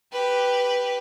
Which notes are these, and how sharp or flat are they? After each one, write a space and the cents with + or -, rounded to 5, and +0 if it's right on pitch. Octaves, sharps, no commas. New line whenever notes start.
G4 +0 B4 +0